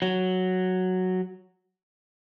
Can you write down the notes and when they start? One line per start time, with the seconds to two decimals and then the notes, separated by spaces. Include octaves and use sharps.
0.02 F#3